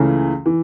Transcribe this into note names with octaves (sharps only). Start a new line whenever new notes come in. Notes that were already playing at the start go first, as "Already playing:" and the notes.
Already playing: C#2 C#3 E3 A3 C#4
E3